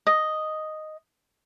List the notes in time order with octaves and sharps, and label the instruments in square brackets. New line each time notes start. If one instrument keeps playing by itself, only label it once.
[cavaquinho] D#5